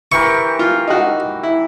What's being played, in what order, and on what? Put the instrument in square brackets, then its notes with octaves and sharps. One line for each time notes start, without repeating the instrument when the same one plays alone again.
[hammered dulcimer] E3 G4 A#4 [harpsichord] C#6
[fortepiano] F4
D#4 F#4
E4